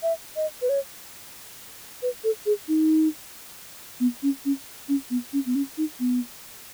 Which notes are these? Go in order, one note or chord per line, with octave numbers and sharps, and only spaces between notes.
E5
D#5
B4
C#5
B4
A4
G#4
D#4
B3
C#4
C#4
C#4
B3
C#4
B3
C#4
D#4
B3